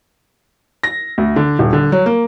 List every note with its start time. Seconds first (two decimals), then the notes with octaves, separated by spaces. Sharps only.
0.83 A#6
1.18 D2
1.36 D3
1.59 D#1
1.73 D3
1.92 F#3
2.06 A#3